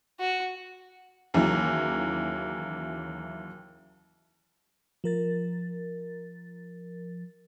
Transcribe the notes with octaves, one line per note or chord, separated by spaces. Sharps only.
F#4
D#2 C#3 E3 F#3
F3 A#4 A6